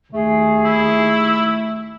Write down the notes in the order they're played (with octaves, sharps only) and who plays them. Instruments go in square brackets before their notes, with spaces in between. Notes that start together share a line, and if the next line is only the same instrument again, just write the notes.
[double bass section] D#2 [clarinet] A3 [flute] G#4
[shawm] E4